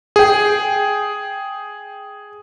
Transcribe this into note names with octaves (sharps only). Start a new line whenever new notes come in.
G#4 G5